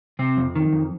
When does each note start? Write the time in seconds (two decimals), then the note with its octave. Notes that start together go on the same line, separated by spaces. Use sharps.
0.19 C3 C4
0.37 F2
0.55 D#3
0.72 F2